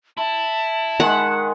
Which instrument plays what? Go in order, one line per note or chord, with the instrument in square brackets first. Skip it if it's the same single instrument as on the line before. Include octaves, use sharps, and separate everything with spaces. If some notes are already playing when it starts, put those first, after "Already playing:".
[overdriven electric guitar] E4 [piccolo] A5
[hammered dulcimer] D#3 G#3 [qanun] F#5